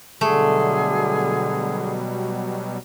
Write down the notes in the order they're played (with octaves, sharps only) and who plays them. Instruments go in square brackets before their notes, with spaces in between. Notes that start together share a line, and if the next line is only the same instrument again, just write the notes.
[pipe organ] B2 F#3 G3 [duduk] D3 [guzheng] A3 [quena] G#4